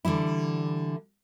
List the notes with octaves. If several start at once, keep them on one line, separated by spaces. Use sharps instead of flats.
D3 E3 G3 E4